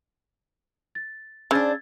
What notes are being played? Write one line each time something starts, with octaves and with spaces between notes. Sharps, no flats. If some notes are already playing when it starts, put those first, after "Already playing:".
A6
C#3 D4 C5 E6 G#6 A6